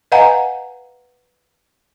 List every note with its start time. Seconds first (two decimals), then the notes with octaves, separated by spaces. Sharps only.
0.12 B4 D#5 F5 F#5 G#5 A#5